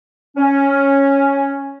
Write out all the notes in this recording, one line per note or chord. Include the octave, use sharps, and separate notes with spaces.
C#4